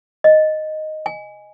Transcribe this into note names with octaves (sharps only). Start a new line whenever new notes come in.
D#5
G#5